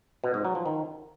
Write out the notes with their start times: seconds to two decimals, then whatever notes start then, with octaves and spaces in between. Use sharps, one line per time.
0.24 B2
0.34 G#2
0.45 F#3
0.55 F3
0.66 D#3